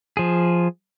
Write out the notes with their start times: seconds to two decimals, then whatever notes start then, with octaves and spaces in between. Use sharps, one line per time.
0.17 F3 G#4